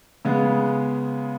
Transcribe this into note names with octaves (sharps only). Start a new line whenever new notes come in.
C#3 G#3 B3